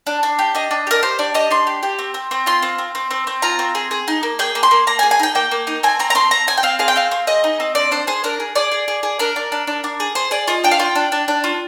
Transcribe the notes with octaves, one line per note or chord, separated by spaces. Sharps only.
D4
D4
G4
D4 D#5
D4
G4
A#4
G4 C5
D4 D5
G4 D#5
D4 C6
G4
G4
C4
C4
C4
F4 C6
C4
C4
C4
C4
C4
F4 A#5
C4
G#4
G#4
D#4
A#3
G#4 G5
A#3
C6
A#3
A#3 A#5
G#5
G#4
G#5
D#4 G5
A#3 G5
A#3
D#4
C4 G#5
C4 A#5
A#5
C4 C6
C4 A#5
C4 G#5
G5
C4 F5
G#4 F5
G5
C4 F5
C4
G#4 D#5
D#4
C4
D4 D5
D4 C5
G#4 C5
D4 A#4
G#4
G#4 D5
G#4
G#4
G#4
D4 A#4
D4
D4
D4
D4
G#4
G#4 C5
G#4 D5
F4 D#5
D4 G5
F5
F4 G5
D4
D4
D4
F4